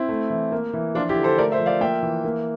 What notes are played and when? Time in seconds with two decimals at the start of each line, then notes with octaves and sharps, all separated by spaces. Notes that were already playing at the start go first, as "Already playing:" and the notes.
Already playing: C4 E4
0.09 A3
0.30 E3
0.52 A#3
0.73 E3
0.95 F3 D4 F4
1.09 E4 G4
1.16 D3
1.23 A4 C5
1.38 A3 A#4 D5
1.52 C5 E5
1.60 F3
1.66 D5 F5
1.81 A#3 E5 G5
2.02 E3
2.24 A#3